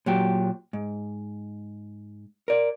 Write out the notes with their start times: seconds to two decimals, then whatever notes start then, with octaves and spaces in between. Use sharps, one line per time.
0.06 A#2 F#3 G4
0.73 G#2
2.48 A#4 D5